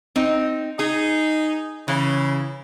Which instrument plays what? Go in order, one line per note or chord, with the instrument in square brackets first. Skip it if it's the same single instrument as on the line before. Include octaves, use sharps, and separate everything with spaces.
[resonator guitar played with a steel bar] C4 D#4
[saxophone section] D#4 [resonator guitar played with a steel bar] G#4
[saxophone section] C#3 [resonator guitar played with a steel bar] E3